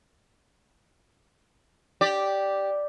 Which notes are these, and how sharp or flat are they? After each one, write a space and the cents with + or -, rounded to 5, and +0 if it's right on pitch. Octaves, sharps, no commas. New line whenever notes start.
G4 -5 D5 +0